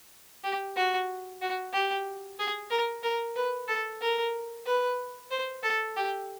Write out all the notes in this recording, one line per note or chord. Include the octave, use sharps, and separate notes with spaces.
G4
F#4
F#4
G4
G#4
A#4
A#4
B4
A4
A#4
B4
C5
A4
G4